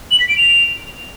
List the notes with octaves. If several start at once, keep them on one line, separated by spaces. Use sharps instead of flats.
F#7
B6
D7
F7